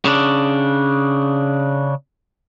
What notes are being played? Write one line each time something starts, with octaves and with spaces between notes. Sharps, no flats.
C#3 D4